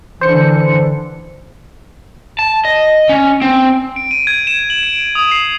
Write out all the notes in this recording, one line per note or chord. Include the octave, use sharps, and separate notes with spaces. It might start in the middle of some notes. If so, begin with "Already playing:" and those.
D3 E3 C5 C#7
A5
D#5
C#4
C4
D7
D#7
G#6
E7
F#7
D7
D#6
C7